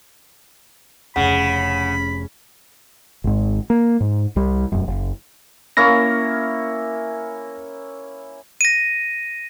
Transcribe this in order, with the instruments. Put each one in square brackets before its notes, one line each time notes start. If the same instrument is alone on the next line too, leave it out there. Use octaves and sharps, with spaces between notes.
[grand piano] F1 [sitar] C#3 [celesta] F#5 [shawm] B5
[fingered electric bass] G#1 G#2
A#3
G#2
C2 G3
E1 F#2
F#1
[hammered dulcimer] A#3 C#4 E4 [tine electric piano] A#6
[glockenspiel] A#6 D#7